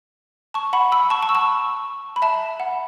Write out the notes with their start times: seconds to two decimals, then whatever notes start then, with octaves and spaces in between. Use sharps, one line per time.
0.54 A5 C#6
0.73 F#5 B5
0.92 B5 E6
1.10 A5 C#6
1.23 A5 C#6
1.29 E6
1.35 A5 C#6
2.16 B5
2.22 E5 A5
2.60 F#5